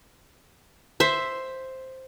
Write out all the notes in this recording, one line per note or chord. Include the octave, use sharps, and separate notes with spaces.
C5 E5